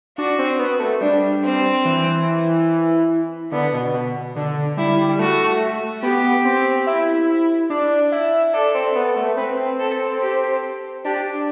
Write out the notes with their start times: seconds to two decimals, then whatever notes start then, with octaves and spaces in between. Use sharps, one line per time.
0.18 D4 F#4
0.39 C4
0.59 B3
0.80 A3
1.01 G3 D4
1.43 C4
1.85 E3
3.52 D3 B3
3.73 B2
3.94 B2
4.35 D3 D4
4.77 G3 E4
5.09 G3
5.19 A3 F#4
6.02 B3 G4
6.45 C4
6.87 E4
7.70 D4
8.12 E4
8.54 D4 A4
8.74 C4
8.95 B3
9.16 A3
9.37 C4 B4
9.79 A4
10.21 G4
11.05 D4 G4